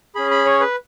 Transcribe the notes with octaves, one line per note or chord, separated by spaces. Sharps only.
C#4 G#4 B5
B5
C#5
B4